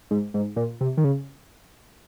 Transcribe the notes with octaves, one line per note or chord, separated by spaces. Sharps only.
G#2
G#2
A#2
C3
D#3
C#3